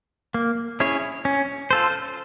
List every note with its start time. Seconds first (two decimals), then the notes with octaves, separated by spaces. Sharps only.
0.34 A#3
0.80 C#4 E4 G#4 C#5
1.25 C#4
1.71 F4 A4 C5